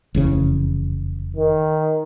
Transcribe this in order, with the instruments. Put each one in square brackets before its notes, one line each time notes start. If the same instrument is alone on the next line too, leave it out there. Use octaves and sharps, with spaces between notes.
[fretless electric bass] F1 E2 C#3
[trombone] D#3